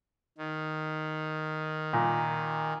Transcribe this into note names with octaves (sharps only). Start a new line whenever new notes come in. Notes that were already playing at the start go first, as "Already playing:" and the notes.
D#3
A#2